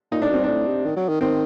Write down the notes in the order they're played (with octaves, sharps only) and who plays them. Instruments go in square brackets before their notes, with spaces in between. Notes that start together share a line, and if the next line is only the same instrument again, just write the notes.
[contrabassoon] A#2 [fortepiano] D#4
[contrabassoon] A2 [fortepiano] D4
[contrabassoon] F#2
[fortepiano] C4
[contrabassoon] G2
[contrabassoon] A2 [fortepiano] D4
[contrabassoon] C3
D#3
F#3
D#3
[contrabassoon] D#3 [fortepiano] C4